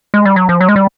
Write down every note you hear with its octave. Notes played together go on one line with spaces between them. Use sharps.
G#3
G3
F#3
F3
F#3
G#3
G3